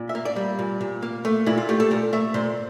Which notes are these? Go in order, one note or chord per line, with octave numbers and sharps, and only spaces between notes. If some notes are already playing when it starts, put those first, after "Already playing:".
Already playing: A#2
E5
A#3
D5
G3
A#2
A#2
A#3
A3
A#2 E4
F4
A3 G4
A4
A#2 A#4
A3 E5
A#2 C5